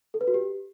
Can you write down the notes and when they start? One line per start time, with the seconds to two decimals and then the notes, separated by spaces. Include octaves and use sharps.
0.14 A4
0.21 B4
0.27 F#4
0.34 G4